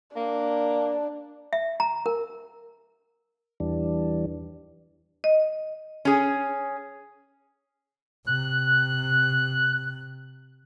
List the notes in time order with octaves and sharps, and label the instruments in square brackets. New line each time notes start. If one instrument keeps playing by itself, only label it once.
[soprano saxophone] A#3 [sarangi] D4
[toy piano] E5
A#5
A#4
[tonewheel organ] E2 E3 G3 D4
[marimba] D#5
[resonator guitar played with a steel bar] C#4 G#4
[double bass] C3 [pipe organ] F#6